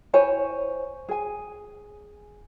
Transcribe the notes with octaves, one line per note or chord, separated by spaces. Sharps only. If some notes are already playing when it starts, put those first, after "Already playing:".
E4 C5 C#5 G#5
G#4 G#5